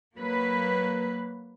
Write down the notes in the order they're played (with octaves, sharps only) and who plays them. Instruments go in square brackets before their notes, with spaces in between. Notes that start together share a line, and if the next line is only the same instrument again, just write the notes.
[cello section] F#3 A#3 B4